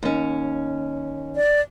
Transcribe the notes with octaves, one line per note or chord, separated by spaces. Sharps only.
D#2 C#4
D5